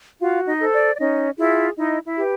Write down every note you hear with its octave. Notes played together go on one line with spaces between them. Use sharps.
F4 F#4 F5
D#4 D#5
A4 C5
D5
D5
C#4 D#4 D#5
E4 F4 G#4 E5
D#4 E4 D#5
E4 E5
G4 B4